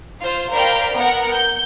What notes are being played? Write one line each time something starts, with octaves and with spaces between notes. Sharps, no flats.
F4 C5 F5
A#4 C5 D5 F5 G5 B5
B3 A#4 F#5
G6